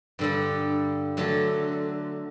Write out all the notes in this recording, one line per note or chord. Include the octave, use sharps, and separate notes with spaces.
G2 D3 G3
D3 F#3 A3